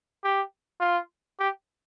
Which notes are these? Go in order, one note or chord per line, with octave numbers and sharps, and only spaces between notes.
G4
F4
G4